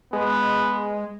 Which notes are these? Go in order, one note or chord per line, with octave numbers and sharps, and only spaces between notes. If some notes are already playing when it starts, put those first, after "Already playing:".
G#3 B3